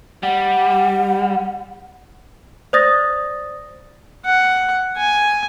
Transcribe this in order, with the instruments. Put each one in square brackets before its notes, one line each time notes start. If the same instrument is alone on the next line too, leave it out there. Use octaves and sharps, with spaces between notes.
[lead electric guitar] G3 [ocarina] F#5
[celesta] C5 D5 D#6 A6 A#6
[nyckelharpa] F#5
G#5